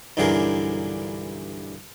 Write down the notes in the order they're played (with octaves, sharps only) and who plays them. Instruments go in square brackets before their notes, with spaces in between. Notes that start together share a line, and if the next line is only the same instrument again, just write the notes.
[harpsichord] B1 G2 D3 E3 G#4 A#4